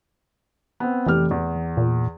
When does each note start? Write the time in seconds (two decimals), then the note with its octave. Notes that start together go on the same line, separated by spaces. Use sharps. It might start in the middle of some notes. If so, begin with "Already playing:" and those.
0.80 B3 C4
1.06 F1 E3 G4 F6
1.31 E2
1.77 A#2